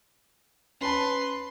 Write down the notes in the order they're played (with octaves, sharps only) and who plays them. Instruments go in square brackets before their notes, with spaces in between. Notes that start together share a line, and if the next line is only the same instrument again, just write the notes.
[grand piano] C#4 A5 [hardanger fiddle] B4 C6